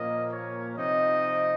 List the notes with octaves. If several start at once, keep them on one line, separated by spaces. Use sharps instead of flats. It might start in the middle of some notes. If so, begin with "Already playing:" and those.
Already playing: A#2 F3 A#3 C#4 D#5
C#5
C3 F3 C4 D#4 D#5